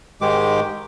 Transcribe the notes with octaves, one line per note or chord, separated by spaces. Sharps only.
G#2 D#3 G#3 G4 D6